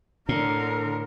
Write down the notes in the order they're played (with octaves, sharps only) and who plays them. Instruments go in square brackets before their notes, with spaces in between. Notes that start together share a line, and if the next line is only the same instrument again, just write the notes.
[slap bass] A2 [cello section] D3 [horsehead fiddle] A#4